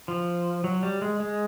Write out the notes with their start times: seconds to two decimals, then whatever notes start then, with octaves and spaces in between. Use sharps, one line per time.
0.08 F3
0.64 F#3
0.83 G3
1.02 G#3
1.20 G#3